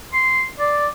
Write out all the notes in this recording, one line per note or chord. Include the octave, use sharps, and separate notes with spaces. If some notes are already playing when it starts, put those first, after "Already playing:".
C6
D5